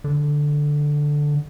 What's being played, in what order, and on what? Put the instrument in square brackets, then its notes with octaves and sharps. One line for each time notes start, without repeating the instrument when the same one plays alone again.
[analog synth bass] D3